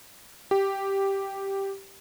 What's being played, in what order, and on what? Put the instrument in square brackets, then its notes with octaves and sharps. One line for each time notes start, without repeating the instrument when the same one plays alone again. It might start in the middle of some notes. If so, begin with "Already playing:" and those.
[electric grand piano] G4